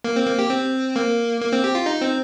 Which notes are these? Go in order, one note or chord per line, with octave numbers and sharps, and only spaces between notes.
A#3
C4
A#3
G4
C4
A#3
A#3
C4
G4
F4
D#4
C4